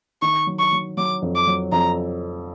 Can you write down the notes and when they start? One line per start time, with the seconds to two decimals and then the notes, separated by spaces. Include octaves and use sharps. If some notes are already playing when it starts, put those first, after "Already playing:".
0.22 D#3 C#6
0.47 F#3
0.59 C#6
0.73 F#3
0.97 F#3 D6
1.22 F2
1.35 D6
1.47 F#3
1.72 F2 A#5